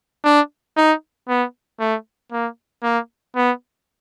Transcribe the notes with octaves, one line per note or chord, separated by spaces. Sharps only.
D4
D#4
B3
A3
A#3
A#3
B3